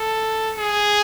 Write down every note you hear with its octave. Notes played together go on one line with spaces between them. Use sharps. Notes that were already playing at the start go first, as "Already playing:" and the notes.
Already playing: A4
G#4